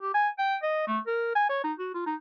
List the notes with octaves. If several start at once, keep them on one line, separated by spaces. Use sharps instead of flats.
G4
G#5
G5
D#5
A3
A#4
G#5
C#5
D#4
F#4
F4
D#4